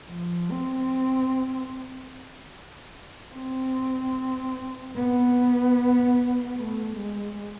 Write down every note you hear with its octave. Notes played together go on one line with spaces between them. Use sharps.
F3
C4
C4
B3
A3
G#3